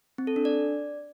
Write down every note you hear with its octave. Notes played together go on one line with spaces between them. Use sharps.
C4
A4
D4
D5